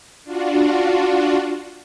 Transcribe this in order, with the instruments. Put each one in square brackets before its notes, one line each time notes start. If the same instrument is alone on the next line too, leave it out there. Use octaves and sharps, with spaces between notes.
[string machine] D4 F4 F#4